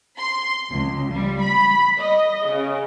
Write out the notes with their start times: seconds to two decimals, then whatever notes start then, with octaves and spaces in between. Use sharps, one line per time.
0.18 C6
0.70 C#2
1.11 G3
1.40 B5
1.99 D#5
2.47 C#3